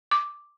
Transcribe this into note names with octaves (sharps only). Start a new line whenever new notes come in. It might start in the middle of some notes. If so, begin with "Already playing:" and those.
D6